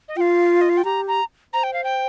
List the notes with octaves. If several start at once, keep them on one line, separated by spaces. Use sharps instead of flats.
D#5
F4 F5 G5
D#5
F5
G5
G4 A#5
A#5
C5 A#5
G5
F5
G5